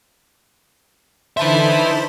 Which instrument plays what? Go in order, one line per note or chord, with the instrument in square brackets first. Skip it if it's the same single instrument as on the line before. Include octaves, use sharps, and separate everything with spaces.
[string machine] D3 E3 D#4 [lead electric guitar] B4 E5 [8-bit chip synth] C5 A5 B5